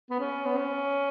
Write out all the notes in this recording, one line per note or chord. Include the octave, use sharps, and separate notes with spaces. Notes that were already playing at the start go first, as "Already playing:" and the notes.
B3
C#4
B3
C#4